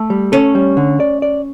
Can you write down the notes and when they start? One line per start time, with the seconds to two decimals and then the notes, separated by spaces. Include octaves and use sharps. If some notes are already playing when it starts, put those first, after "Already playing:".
Already playing: A3
0.10 G3
0.32 C#4 A4
0.55 G3
0.77 D3
1.00 D5
1.22 D5